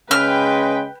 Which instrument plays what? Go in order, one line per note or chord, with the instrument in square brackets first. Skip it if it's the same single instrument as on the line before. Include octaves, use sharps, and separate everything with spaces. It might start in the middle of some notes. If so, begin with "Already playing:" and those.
[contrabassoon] C#3 [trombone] G#3 [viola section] B4 G5 [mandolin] F6